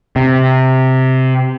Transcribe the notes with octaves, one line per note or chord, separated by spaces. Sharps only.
C3